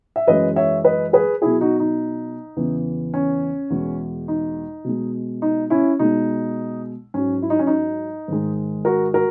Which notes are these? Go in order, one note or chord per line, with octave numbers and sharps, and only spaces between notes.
E5
F#2 E3 G#3 B4 D#5
C#5 E5
B4 D#5
G#4 B4
B2 F#3 E4 G#4
D#4 F#4
D#4
E2 C#3 E3
C#4
E2 B2 G#3
D#4
B2 G#3
D#4
C#4 E4
B2 G#3 D#4
G#2 F#3 C#4
E4
D#4
C#4
D#4
G#2 D#3 G#3
F#4 A#4
F#4 A#4